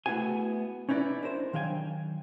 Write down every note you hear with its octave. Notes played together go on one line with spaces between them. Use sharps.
A3 B3 E4 F#4 G#4 G#5
C#4 D#4 E4 B4 D5
D4 A#4 C5
D#3 F#3 F5 G5 G#5